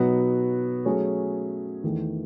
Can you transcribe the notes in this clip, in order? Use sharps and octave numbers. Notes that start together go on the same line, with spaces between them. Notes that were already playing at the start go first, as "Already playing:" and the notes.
Already playing: B2 F#3 B3 D#4 F#4
F#3 A3 C#4 G#4 C#5
E2 D#3 A3